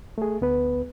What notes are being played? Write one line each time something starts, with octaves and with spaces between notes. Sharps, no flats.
A3 G#4
D2 B3 B4